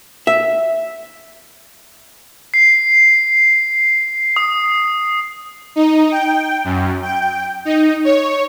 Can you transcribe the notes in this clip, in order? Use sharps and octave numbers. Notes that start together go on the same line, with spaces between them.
E5
C7
D#6
D#4
G5
F#2
G5
D#4
C#5